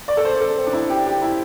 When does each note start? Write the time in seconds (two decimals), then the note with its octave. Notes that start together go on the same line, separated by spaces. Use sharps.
0.08 D5
0.17 A4
0.25 C5
0.40 A4
0.58 C4
0.66 D4
0.73 E4
0.90 G4
1.06 G4
1.22 E4